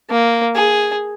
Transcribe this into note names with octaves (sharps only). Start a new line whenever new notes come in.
A#3
G#4